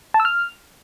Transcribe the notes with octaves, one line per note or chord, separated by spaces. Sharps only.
A5
E6
F6